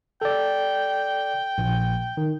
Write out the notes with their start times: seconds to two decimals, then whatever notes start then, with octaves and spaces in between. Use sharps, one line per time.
0.22 A4 D5 G5
1.58 A#1
2.17 D#3